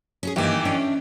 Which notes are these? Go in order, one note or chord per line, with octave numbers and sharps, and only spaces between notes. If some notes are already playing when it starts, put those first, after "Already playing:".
C#4 F#4 G#4
G2 D#3 E3 A#3 G4
C#4 D4 E4